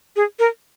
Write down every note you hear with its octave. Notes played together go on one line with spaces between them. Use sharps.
G#4
A#4